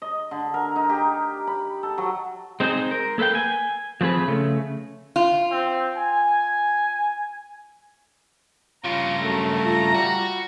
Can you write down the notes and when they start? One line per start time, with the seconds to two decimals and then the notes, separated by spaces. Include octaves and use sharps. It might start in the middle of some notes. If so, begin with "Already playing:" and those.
0.02 D#5
0.31 D3
0.54 A#4
0.76 D#4
0.89 G4
1.47 B5
1.83 A4
1.98 F#3
2.60 G#3 C4 D#4 G#4 C5
2.91 A#4
3.18 A#3 A4 B4 F5 G5
3.35 G#5
4.01 F3 A3 C4 G#4 B4
4.28 C#3 A3
5.16 F4
5.51 C4
5.97 G#5
8.84 G2 C#3 F4 A#5
9.21 F#2 A3
9.64 F4 A#5
9.94 G3 F#4